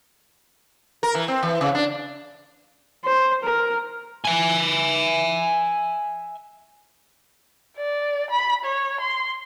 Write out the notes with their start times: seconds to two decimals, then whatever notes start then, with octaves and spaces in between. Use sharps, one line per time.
1.03 A#4
1.15 E3
1.28 C4
1.43 E3
1.61 C#3
1.75 D4
3.04 C5
3.44 A#4
4.25 E5 G#5
7.77 D5
8.30 B5
8.65 C#5
9.01 C6